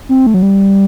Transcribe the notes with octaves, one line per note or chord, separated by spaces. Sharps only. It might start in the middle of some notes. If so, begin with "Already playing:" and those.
C4
A3
F#3
G3